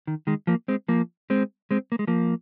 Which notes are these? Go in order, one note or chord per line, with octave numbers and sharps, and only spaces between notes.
D#3
D#3 G#3
F3 A#3
G#3 C4
F3 A#3
G#3 C4
G#3 C4
A#3
G#3
F3 A#3